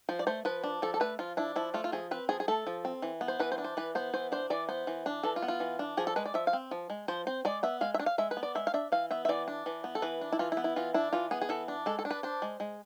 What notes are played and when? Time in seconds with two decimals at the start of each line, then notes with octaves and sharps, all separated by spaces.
0.09 F3 C5
0.19 D5
0.27 A3 C5
0.45 F3 B4
0.64 D4
0.82 F3 A4
0.94 A4
1.00 A3 B4
1.19 F3 F4
1.37 D4 E4
1.56 F3 E4
1.74 A3 F4
1.84 F4
1.92 F3 G#4
2.11 C4 B4
2.29 F3 G#4
2.40 G#4
2.48 A3 A4
2.67 F3
2.85 C4
3.02 E3
3.21 B3
3.28 C5
3.40 E3 B4
3.52 C5
3.58 D4
3.64 C5
3.77 E3 B4
3.95 B3 C5
4.14 E3 C5
4.32 D4 C5
4.50 E3 D5
4.69 B3 C5
4.87 E3
5.06 D4
5.23 E3 A4
5.36 F4
5.42 B3
5.48 F4
5.60 E3
5.79 D4
5.97 F3 G#4
6.07 A4
6.16 G#3 B4
6.26 D5
6.34 F3 E5
6.47 F5
6.53 C4
6.71 F3
6.90 G#3
7.08 F3 C5
7.27 C4 C5
7.45 G#3 D5
7.63 B3 E5
7.81 G#3 F5
7.94 E5
7.99 D4
8.06 F5
8.18 G#3 E5
8.31 B4
8.37 B3
8.43 D5
8.55 G#3 E5
8.67 F5
8.74 D4 E5
8.92 E3 F5
9.11 B3 E5
9.25 E5
9.29 E3 D5
9.48 D4
9.66 E3
9.84 B3
9.95 A4
10.02 E3 B4
10.21 D4
10.32 E4
10.39 E3 F4
10.52 E4
10.57 B3
10.64 E4
10.76 E3 F4
10.94 D4 E4
11.13 E3 F4
11.31 B3 G#4
11.41 G#4
11.49 E3 A4
11.68 D4
11.86 G#3 A4
11.99 A4
12.05 D4
12.11 B4
12.23 D4 C5
12.42 G#3
12.60 G#3